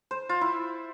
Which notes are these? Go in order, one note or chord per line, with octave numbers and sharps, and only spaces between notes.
C5
F4
E4